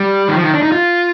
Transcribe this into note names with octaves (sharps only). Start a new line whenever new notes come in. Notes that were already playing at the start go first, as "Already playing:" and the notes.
Already playing: G3
D#3
F3
D#3
D4
D#4
F4